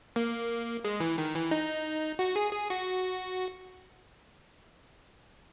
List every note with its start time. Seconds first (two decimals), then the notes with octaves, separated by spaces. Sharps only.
0.16 A#3
0.84 G#3
1.00 E3
1.18 D#3
1.35 E3
1.51 D#4
2.19 F#4
2.36 G#4
2.53 G#4
2.70 F#4